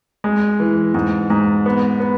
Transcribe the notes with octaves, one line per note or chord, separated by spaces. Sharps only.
G#3
E3
G#2
G#2
B3
B3